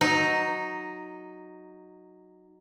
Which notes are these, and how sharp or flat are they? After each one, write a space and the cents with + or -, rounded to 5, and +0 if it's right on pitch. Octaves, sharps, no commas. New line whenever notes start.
F#3 +0 D#4 +0